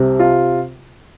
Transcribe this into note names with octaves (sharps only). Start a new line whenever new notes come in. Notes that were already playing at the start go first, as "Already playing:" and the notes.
Already playing: C2 C3
F4